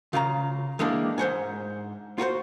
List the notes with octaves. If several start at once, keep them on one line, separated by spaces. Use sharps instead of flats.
C#3 F4 E5 A#5
E3 G#3 A#3 D4 G4
G#2 C5 F#5 G#5
F4 F#4 A#4 C5